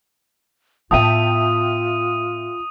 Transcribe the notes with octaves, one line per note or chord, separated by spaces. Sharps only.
A2 B3 F4 E5 G5 A5 D#6 D#7